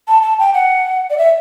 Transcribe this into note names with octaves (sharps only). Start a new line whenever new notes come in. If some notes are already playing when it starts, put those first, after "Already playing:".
A5
A5
G5
F#5
D5
E5